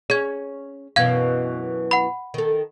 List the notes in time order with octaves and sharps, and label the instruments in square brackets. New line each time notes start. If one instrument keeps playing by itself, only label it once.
[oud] C#4 [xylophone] G#4 G#6
[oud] F#2 B2 E3 [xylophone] F5 G#6
[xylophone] F#5 B5
[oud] D#3 A4